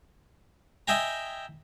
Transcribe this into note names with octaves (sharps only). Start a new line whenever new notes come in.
D#5 E5 G5 G#5 A#5